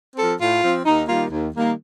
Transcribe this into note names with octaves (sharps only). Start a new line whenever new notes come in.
F3 C4 A4
A2 F4
F3 C4
D#2 D#4
D#3 G3 A#3 F4
D#2
D#3 G3 A#3